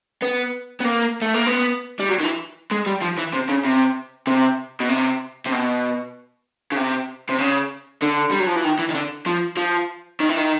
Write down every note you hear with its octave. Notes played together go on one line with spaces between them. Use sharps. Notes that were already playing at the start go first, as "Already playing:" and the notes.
B3
B3
A#3
A3
A#3
B3
G3
F#3
D#3
E3
G#3
G3
F3
E3
C3
C#3
C3
C3
B2
C3
C3
B2
C#3
C3
C3
C#3
D3
G3
F#3
F3
E3
D#3
E3
D#3
D3
F3
F3
D#3
E3
D#3